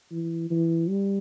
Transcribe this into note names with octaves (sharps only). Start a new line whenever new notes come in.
E3
E3
G3